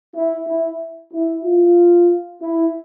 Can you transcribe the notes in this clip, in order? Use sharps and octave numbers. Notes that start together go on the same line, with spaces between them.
E4
E4
E4
F4
E4